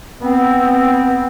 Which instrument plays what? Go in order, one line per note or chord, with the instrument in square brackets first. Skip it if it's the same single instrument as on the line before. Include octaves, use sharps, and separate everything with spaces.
[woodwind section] B3 C4